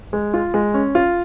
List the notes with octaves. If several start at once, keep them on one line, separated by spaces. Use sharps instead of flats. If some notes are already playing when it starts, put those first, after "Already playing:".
G#3
F4
G#3
C#4
F4